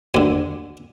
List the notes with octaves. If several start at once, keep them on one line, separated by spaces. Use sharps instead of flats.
D2 D3 G#5